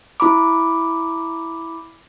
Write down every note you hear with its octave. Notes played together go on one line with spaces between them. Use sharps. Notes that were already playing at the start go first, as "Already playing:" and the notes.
E4 B5 D6